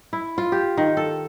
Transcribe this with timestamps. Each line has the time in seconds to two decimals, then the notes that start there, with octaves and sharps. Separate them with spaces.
0.13 E4
0.38 F4
0.52 G4
0.77 D#3
0.97 A4